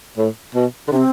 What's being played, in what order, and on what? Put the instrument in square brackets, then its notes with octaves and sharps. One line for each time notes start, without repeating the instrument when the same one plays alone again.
[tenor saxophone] A2
B2
D3
[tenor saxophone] C3 [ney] D4
[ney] C4